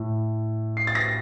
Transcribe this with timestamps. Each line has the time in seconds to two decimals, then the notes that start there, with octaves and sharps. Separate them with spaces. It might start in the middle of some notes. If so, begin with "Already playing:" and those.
Already playing: A2
0.77 C7
0.87 A6
0.95 A#6